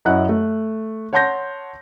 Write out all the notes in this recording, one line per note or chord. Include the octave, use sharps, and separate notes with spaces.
F#2 E4 D#5 F#5 F#6
A3
C#5 F#5 A5 C6 G6 A#6